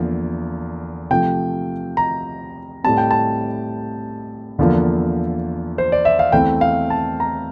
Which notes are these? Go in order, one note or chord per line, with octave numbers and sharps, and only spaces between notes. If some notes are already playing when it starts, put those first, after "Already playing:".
Already playing: E2 D3 F3 A#3
C3 F3 A3 G5
A#5
A2 G3 C4 A5
G5
A5
E2 D3 F3 A#3
C5
D5
E5
F5
E2 E3 A3 C4 G5
F5
A5
A#5